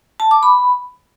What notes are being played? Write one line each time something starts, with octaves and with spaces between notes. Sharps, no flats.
A5
D6
B5